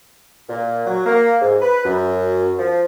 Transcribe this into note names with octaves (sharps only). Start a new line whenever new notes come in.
A#2
F#3
A#3
G#2
B4
F#2
F3